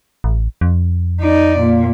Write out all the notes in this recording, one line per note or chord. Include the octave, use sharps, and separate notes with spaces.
A1
F2
D#4 D5
A#2